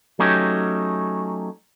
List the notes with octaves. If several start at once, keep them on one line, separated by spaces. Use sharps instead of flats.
F#3 A3 C#4 D#4 G4